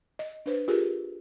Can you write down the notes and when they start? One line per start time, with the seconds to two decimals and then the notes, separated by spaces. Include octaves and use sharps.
0.19 D#5
0.46 D4 B4 C5
0.68 F4 G4 G#4 A#4